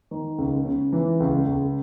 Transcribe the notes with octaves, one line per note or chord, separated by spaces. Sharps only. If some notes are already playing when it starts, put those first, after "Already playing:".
D#3
C#2
C#3
E3
C#2
C#2